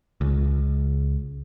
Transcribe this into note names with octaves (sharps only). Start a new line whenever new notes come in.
C#2